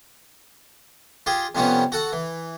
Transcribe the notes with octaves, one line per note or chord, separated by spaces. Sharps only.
F4 G4 G#4
F2 C3 F3 G3 B3 C#4
F#4 A4 F#5
E3